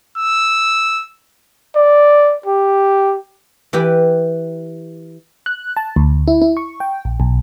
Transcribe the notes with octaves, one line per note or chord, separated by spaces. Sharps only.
E6
D5
G4
E3 E4 G4 B4
F#6
A5
D2
E4
E4
C#6
G5
A#1
B1